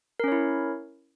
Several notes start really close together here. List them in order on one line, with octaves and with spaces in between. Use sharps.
A#4 C#4 C#5 E4